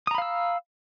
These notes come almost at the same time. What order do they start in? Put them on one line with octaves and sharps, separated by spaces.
D#6 A#5 B5 F5 E6